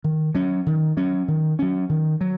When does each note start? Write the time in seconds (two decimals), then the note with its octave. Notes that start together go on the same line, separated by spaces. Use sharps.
0.04 D#3
0.35 F#3 C#4
0.66 D#3
0.97 F#3 C#4
1.28 D#3
1.59 F#3 C#4
1.89 D#3
2.21 F#3